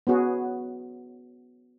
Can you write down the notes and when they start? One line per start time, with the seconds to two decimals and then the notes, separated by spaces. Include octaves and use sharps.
0.07 B3 C#4 F#4 G#4